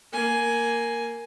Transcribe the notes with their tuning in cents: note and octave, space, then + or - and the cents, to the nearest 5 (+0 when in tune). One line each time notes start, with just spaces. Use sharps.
A#3 +0 G#5 +10